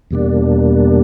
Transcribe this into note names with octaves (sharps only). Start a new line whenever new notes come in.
E2 B2 G3 A#3 D4